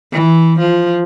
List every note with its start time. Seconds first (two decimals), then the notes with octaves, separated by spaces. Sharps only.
0.12 E3
0.59 F3